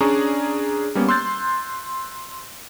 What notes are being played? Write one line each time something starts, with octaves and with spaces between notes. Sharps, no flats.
C#4 D4 G#4 D5 A#5 C#6
G3 A#3 B3 C#4
C6 E6 F#6 G6 A6